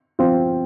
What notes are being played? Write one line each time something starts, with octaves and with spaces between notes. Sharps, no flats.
F3 C4 F4